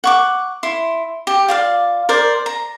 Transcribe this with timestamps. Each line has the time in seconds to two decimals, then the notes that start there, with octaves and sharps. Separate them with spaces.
0.04 F#5 C#6 D6
0.63 E4 C6
1.27 G4
1.48 F4 D5 F5
2.09 A#4 C5 D5
2.46 A#5